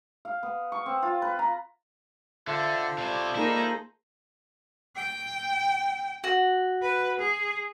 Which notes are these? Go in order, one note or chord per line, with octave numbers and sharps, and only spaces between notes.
F5
B3
C#6
C4
F4
B4
A#5
D3 F4 A4 C5 E5
C3 E4 D5
A#3 D#4 E4 G#4
G5
F#4
B4
G#4